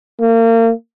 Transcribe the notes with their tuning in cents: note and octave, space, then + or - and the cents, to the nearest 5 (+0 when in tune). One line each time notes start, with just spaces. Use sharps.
A#3 -35